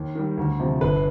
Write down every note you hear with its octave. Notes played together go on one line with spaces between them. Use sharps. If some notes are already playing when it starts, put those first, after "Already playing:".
Already playing: D#2
D#3 G3
D2
C3 F3
G1 B4